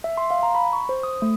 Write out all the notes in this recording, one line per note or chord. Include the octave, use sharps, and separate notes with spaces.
E5
C6
F5
A#5
B5
C#6
C5
D#6
A3